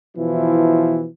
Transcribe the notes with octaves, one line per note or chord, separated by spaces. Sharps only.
B2 E3 F3 E4